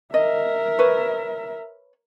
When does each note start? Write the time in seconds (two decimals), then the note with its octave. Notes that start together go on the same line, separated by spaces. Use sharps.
0.14 A#4 D#5 E5
0.79 B4 C#5